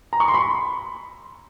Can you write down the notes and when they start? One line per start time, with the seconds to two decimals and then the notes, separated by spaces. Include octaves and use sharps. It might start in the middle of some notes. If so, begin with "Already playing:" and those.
0.13 A#5
0.20 C#6
0.28 C6
0.34 B5